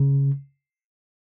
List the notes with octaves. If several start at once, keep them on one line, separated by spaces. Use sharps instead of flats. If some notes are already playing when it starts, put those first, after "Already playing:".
Already playing: C#3